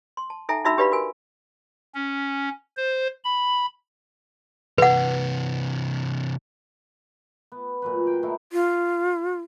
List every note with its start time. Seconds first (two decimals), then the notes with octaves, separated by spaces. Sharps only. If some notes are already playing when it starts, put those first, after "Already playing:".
0.17 C6
0.30 A5
0.49 D#4 A4 E5 G5 G#5 A#5
0.64 D4 D#4 F#4 E5 B5 E6
0.77 D4 G4 B4 D5 F5 B5
0.92 F#4 A#4 G#5
1.95 C#4
2.77 C5
3.24 B5
4.78 C3 E3 B4 F#5
7.52 B3
7.82 A#2 F#3 B4
8.07 G5
8.23 A3 D#4 E4 F5
8.53 F4